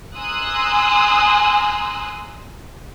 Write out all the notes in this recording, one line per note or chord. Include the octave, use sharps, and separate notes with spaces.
G#5 A#5 C6 D#6 E6 F#6